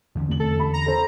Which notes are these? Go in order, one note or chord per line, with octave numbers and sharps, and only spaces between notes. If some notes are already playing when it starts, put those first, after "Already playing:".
E2 D3 C#4
F1 F#7
A4
B5
A#5
A4 C5